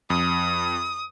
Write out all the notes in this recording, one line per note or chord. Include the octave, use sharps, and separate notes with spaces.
F2 D#6